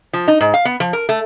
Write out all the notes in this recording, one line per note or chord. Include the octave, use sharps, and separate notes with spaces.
F3
D#4
G#2
F5
B3
F3
A#4
A3